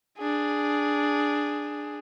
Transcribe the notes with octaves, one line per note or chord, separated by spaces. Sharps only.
D4 G#4